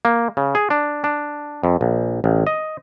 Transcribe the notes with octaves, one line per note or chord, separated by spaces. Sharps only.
A#3
C#3
G#4
D4
D4
F2
A#1
A1
D#5